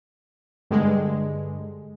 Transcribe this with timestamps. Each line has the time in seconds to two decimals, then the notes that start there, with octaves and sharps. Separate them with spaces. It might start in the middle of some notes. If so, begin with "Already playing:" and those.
0.71 G2 D3 G#3